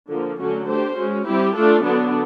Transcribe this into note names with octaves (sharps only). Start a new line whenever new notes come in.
D3 F3 A#3
D3 F#3 A3 C#4 F#4
A3 D4 G4 C5
G#3 C#4 F#4
G3 C4 E4 G4
A3 D4 F4 A4
D3 F#3 B3 D4